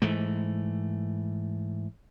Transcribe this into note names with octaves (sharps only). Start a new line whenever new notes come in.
G#2 E3 A3